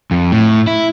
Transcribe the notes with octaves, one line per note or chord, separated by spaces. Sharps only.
F2
A2
E4